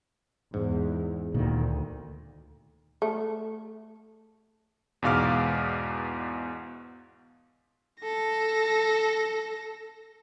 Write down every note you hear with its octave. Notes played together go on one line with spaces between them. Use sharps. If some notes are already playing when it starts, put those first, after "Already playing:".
E2 G#2
D2 A#2 D#3
A3
E2 G#2 B2 F5 D6 F6
A4 A#6